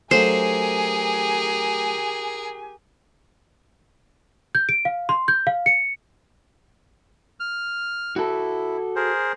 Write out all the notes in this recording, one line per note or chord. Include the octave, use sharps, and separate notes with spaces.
F#3 A3 D4 G4 G#4 A#4 C5 G#5
G6
D7
F5
C6
G6
F5
C#7
F6
E4 F#4 A4
G#4 A#4 C5